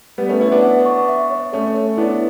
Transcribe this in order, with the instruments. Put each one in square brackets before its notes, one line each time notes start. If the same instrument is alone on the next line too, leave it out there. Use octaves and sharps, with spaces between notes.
[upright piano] G3 B3 [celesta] B4
[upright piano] A3 C#4
[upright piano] C#4 E4 [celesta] B4
[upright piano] B3 D4
[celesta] F#5
C#6
E5
C#5
[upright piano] A3 C#4 [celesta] A4
[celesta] C#5
[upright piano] B3 D4 [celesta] E4